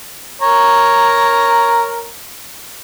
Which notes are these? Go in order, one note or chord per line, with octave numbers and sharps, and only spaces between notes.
A#4 C#5 A#5